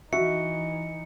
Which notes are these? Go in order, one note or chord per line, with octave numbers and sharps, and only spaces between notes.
E3 D#4 F#4 E5 C#7